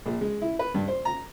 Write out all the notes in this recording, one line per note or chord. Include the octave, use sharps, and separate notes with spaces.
A#1
G#3
E4
B4
G2
C5
A#5